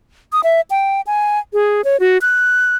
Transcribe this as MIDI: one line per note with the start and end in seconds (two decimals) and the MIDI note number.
0.32 0.41 87
0.44 0.61 76
0.70 1.01 79
1.07 1.39 80
1.53 1.82 68
1.84 1.97 73
2.00 2.18 66
2.21 2.76 90